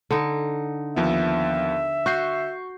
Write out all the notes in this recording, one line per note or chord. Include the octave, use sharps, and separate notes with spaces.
D3 D#4
D#2 F3 B3 E5
F#4 C#6 G6 C7